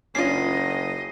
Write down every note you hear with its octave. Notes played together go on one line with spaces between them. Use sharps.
F#1 C#4 D4 F4 D#5 C7